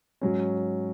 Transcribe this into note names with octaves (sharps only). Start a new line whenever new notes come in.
G#2 F#3 C#4